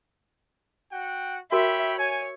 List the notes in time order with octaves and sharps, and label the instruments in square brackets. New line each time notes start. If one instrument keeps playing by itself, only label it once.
[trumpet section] F#4 F#5 G5
[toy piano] F#4 A#4 [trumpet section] C#5 G5 B5 [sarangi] E5
[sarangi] C#5 [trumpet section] G#5